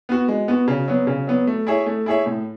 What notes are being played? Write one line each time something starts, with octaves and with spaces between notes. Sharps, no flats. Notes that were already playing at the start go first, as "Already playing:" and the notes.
B3 F#4
G#3
B3 F#4
C#3
F#3 B3
C#3
F#3 B3
A3
E4 G#4 C#5 E5
A3
E4 G#4 C#5 E5
A2